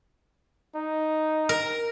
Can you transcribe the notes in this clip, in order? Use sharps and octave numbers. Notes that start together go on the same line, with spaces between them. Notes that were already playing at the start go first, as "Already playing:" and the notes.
D#4
A#4